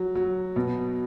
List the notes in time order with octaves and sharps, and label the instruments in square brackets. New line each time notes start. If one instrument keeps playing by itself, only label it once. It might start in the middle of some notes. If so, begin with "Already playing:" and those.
Already playing: [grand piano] F#3
F#3
B2